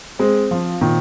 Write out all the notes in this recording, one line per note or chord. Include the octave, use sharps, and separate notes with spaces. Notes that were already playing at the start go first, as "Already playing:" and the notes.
G#3 C4
F3 F4
A#2 D#3